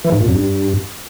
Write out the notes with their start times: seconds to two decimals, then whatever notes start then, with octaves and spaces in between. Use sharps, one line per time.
0.04 E3
0.12 G#2
0.20 A#2
0.28 F#2
0.36 G2